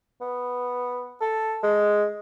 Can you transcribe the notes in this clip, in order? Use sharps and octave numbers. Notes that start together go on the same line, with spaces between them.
B3
A4
G#3